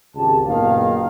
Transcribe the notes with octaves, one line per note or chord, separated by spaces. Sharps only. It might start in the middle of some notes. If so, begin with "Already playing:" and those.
G#1 C#2 G4 A5
F#1 A#2 D#3 B3 F5